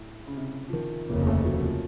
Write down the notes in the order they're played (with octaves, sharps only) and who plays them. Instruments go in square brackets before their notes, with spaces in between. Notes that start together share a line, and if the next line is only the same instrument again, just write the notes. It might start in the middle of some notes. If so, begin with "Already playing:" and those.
Already playing: [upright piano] A2
C#3
C3
F3
D#3
[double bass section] F1 D#2 C#3 [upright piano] A#3
[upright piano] A3
F#3
F3